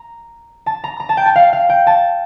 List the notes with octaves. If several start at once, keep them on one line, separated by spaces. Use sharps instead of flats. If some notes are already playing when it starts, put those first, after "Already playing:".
Already playing: A#5
A5
A#5
A#5
A5
G5
A5
F5
F5
G5
A5